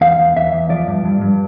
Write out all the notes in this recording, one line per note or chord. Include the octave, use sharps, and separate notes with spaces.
E2 F5
E2
E2 E5
E2
F3 D5
G2
G2
G2